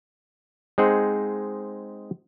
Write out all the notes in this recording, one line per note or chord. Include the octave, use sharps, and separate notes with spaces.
G#3 C4 D#4 G#4 C5 F#5